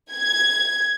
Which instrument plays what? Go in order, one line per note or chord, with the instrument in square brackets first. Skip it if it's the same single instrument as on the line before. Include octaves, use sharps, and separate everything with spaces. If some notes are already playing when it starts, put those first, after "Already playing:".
[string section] G#6